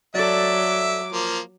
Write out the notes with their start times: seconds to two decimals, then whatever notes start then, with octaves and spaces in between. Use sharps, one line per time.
0.15 F#3 A4 D5 E5 D6
1.12 F3 A#3